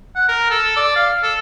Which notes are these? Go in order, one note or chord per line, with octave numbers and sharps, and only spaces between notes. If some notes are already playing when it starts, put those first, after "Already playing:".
F#5
A#4
A4
D5
F5
A4